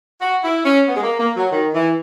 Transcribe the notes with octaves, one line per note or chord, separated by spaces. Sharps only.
F#4
E4
C#4
B3
G#3
A#3
A#3
F#3
D#3
E3